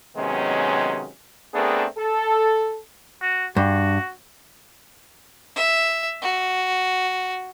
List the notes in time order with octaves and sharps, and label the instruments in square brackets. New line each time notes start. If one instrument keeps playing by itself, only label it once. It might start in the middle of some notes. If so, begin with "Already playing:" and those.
[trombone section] C3 D#3 F#3 G#3 B3 C#4
A3 B3 C4 D4 G#4 A#4
A4
[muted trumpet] F#4
[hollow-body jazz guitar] G2 [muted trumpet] F#4
[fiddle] E5
F#4